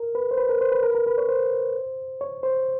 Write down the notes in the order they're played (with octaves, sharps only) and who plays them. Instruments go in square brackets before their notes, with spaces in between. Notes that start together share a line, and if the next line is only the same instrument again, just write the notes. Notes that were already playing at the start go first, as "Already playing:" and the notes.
Already playing: [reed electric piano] A#4
B4
C5
B4
A#4
C5
B4
A#4
B4
A#4
B4
C#5
C5
C#5
C5